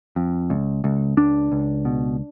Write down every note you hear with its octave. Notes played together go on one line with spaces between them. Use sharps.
F2
C#2
C#2
C#2 D4
C#2
B2